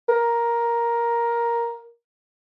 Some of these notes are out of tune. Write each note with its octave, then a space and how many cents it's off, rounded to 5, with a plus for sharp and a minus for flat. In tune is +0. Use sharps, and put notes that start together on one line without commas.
A#4 +10